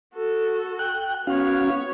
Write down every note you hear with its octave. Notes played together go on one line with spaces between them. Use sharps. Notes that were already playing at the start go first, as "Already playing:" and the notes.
F#4 A4
G5 F#6
B3 C#4 F#4 C#5 F5